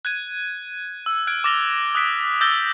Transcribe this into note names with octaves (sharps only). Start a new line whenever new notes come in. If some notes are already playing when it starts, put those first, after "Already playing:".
F#6 G#6 D#7
E6
F6 F#6 G#6 D7
D6 A6 A#6 F7 G7
D#6 F#6 B6 D7
D6 E6 G6 A6 A#6 G7